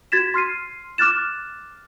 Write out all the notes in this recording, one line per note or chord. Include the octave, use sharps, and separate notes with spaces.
F#4 G#6 A6 B6 E7
C6 F6 C7 D#7
D6 F6 F#6 A6 E7